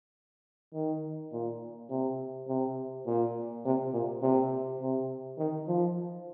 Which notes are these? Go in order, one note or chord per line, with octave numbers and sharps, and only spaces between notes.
D#3
A#2
C3
C3
A#2
C3
A#2
C3
C3
D#3
F3